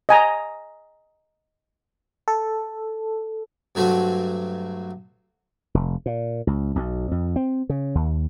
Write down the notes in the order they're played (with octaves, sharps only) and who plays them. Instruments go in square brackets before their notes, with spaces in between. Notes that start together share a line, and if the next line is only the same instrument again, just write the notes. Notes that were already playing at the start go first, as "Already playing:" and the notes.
[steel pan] D#5 G#5 A#5
[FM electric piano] A4
[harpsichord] G2 F#3 A3 C4 F#4
[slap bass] F1
A#2
C#2
B1
F2
C4
C#3
D#2